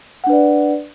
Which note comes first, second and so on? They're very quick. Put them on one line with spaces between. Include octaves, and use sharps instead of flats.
F#5 D4 B4 D5